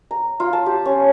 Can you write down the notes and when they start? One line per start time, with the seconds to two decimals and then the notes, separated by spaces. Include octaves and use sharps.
0.11 A#5
0.40 F4
0.53 A5
0.66 G4
0.85 C#4